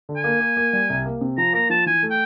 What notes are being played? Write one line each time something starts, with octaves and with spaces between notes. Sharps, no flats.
D3
G#5
A#3
A#3
A#3
G3
C2
A#3
C3
F3 A#5
A#3 A#5
F3 A5
E3 G#5
A3
G5